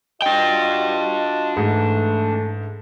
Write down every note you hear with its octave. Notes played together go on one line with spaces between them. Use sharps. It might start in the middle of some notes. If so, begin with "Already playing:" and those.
D4 F4 F#4 D#5 G5
G#2 E3 A3